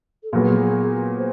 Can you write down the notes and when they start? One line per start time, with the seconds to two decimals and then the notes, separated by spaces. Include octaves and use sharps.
0.23 A4
0.32 A#2 F#3 B3 G#4
1.17 C5